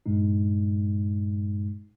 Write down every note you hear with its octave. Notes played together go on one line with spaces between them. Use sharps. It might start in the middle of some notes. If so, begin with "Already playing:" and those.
G2 A#2 G#3 D#4